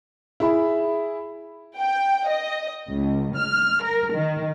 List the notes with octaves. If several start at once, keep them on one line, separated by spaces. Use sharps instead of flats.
E4 G#4 E5 B5
G5
D#5
C#2
F6
A#4
D#3